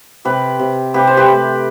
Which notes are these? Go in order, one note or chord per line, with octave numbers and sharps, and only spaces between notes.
C3 G4 B4
C3
C3 G4 B4
C5
G4 B4
A3